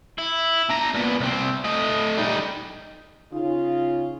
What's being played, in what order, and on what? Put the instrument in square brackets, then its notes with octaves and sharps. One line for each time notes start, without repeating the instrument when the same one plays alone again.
[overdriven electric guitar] E4
D4 A#5
A#2 B3
C2 C4
A3 D#5
G3 D#4
[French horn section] C#3 F4 [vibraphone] D#4